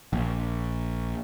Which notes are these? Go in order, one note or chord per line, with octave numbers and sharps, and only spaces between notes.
A#1